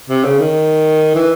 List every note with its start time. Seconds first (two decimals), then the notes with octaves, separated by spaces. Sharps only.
0.10 C3
0.24 C#3
0.39 D#3
1.15 E3